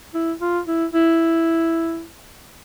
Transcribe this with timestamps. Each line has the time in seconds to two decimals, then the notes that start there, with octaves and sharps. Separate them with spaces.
0.14 E4
0.41 F4
0.67 E4
0.94 E4